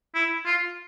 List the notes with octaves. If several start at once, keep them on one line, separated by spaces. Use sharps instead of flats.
E4
F4